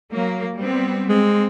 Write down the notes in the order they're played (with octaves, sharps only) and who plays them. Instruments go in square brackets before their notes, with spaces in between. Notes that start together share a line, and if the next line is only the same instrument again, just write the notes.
[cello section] F#3 A#3
G3 B3 C4
[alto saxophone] G#3 [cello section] C4